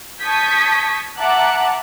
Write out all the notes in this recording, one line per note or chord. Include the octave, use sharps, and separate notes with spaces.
A5 C#6 D#6 G6 G#6 B6
E5 F#5 A5 A#5 D6 F#6